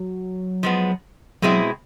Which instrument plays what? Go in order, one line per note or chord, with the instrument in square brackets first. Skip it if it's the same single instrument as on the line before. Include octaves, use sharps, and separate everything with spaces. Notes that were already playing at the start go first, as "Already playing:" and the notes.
Already playing: [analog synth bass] F#3
[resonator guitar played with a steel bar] F3 G#3 B3
[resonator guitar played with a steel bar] B2 G#3 C4 E4 [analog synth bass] F#3